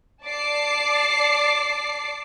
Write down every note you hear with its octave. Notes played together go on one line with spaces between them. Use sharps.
D5 A5 D6 C7